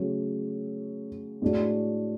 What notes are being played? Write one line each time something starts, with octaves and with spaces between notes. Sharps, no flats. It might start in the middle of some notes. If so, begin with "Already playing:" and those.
Already playing: C#3 F#3 A3
A2 G#3 D4 F#4